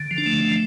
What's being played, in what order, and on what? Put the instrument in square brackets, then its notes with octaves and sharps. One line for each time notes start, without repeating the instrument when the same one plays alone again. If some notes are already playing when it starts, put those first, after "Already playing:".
Already playing: [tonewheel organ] D3
F3
D4
A3